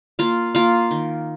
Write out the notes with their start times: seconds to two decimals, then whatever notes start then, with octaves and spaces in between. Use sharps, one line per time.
0.19 A#3 F4 F5
0.55 A#3 F4 F5
0.91 D#3